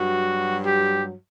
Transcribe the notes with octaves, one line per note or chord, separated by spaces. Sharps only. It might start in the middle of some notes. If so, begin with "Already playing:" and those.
Already playing: G2 F#3 F#4
G4